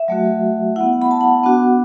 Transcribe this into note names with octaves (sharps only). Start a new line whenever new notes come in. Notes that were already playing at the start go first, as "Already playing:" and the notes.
Already playing: E5
F#3 A3 F#4
B3 E4 F#5
B5
A5
F#5
B3 D4 F#4 F#5